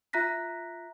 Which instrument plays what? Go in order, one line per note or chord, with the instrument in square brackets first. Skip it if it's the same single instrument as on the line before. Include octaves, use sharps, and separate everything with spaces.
[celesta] F4 E5 A#5 F#6 A#6 B6